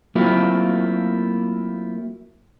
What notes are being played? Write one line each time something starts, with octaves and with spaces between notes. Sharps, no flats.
F#3 A3 A#3 C4 E4 F4